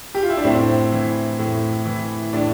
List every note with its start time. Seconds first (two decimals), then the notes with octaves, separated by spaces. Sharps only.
0.15 G4
0.23 F4
0.30 E4
0.37 D4
0.44 A2 C4
0.92 E3
1.39 A2
1.86 E3
2.33 A2 D4